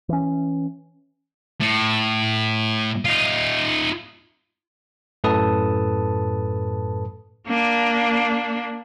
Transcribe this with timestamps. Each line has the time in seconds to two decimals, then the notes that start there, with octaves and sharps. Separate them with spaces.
0.09 E3 C#4
1.60 A2
3.05 D#4 F4
5.24 F#2 A2 A4 B4 A5 D#6
7.47 A#3 D4